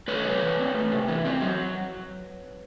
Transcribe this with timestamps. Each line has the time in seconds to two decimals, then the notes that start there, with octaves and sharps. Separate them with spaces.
0.08 A3 B4 C#5
0.25 C3
0.42 E3
0.59 C4
0.75 A3
0.92 C3
1.08 E3
1.25 C4
1.41 F#3